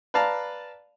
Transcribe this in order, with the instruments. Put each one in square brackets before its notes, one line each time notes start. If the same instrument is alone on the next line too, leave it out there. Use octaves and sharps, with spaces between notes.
[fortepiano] B4 D5 F5 A5 A#5